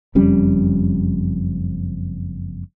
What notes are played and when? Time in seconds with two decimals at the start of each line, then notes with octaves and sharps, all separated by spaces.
0.15 F#1 F2 G3 C#4